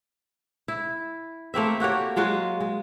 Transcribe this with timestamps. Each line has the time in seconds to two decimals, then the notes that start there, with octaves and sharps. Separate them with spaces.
0.68 E4
1.54 A3 A#3 C4 E5
1.80 A#3 F#4 G4 C#5
2.16 F#3 G#3 F4 F#4
2.60 G#3